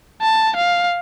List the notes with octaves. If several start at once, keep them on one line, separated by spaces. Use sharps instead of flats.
A5
F5